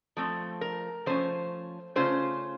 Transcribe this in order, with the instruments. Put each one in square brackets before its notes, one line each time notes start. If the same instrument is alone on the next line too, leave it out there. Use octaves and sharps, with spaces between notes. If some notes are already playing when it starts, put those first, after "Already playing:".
[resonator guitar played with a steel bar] F3 A3 C4
A#4
F3 A3 C#4 C5
C#3 A3 C#4 F4 C5